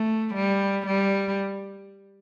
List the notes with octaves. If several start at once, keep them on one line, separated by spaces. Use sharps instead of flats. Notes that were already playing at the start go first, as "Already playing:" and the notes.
Already playing: A3
G3
G3